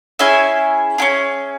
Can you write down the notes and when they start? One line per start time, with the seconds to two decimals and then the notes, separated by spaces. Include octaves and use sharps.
0.19 C#4 E4 G#4 E5 G#5
0.98 C#4 E4 G#4